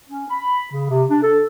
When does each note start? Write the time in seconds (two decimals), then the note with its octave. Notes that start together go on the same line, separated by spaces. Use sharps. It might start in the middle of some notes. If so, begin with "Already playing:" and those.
0.10 C#4
0.30 B5
0.72 C#3
0.90 C3
1.09 D4
1.22 A4